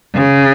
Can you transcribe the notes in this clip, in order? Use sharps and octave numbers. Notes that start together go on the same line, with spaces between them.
C#3